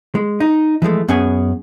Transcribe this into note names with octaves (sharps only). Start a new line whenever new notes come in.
G#3
D#4
E3 F3 G#3 A3
F#2 B3 C#4 G#4 G#5